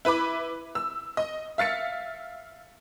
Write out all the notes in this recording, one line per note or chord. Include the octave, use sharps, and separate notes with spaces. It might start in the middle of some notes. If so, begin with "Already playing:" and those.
E4 B4 B5 D6
E6
D#5
E5 F5 A6 C#7